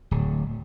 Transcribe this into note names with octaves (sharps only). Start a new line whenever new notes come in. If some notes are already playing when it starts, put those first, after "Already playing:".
D1